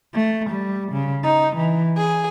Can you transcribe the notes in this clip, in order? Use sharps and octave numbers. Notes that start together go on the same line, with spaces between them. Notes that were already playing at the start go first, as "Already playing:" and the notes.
A3
G3
C#3
D#4
E3
G#4